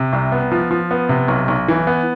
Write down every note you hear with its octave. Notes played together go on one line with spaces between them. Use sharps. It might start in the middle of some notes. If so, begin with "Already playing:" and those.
Already playing: C3
C2
B3
F3
F3
B3
C3
B1
B1
E3
B3